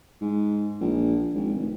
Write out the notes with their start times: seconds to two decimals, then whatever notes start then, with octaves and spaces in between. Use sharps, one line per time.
0.21 G#2
0.81 A#1
1.34 G#1
1.53 F1